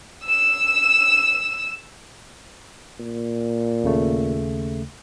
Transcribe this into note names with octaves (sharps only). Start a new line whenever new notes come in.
E6 E7
A#2
D#2 C#3 A3